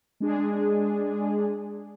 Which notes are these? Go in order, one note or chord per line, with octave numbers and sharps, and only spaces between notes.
G#3 D4 G#4